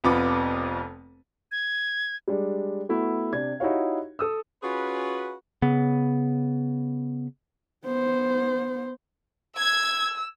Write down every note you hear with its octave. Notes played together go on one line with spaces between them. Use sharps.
F1 F2 B3 F4 B5 D6
G#6
G3 G#3 D4
A3 B3 E4 F#4
C3 D4 G#6
D#4 E4 F#4 G4 C#5 F5
A4 D#6 E6
C#4 F4 F#4 G#4 B4
C#3 B3
B3 C5
E6 G#6